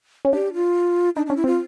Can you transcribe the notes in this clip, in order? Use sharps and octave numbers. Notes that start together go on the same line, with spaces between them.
C#4
D4 G4
F4
D4 D#4
C#4 D4
E4
C4 F4